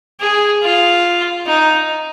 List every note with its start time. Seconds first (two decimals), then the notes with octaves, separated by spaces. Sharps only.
0.21 G#4
0.63 F4
1.47 D#4